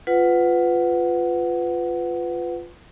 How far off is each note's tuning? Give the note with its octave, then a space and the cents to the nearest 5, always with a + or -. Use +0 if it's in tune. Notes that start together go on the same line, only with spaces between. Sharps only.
F4 +0 B4 +20 F#5 +0